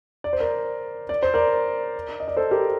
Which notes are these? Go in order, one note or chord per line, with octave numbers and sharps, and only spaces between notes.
D5
C5
A#4 D5
D5
C5
A#4 D5
D#5
D5
A4 C5
G4 A#4